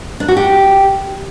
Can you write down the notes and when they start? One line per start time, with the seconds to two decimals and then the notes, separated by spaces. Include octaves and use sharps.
0.20 D4
0.28 F#4
0.37 G4